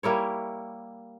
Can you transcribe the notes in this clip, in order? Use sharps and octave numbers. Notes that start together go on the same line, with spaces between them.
G3 A#3 E4 C#5